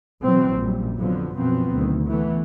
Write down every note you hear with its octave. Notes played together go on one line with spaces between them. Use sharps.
B2 E3 F#3 C4
A#1 F#2 G3
F2 D3 F3 F#3 B3
F#2 B2 F3 F#3 B3 C4
D2 D#3
E3 A3 B3